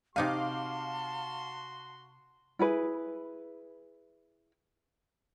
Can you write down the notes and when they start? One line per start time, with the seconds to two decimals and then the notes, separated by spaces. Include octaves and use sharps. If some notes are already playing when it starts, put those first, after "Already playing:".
0.16 C3 D#4 F#4 F5 G#5 A5 C6 D6
2.59 E4 G#4 B4